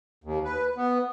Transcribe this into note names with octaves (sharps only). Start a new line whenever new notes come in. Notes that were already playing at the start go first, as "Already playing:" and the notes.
D#2
B4
B3